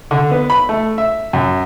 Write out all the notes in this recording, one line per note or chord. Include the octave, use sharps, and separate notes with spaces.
D3
B3
B5
A3
E5
F#2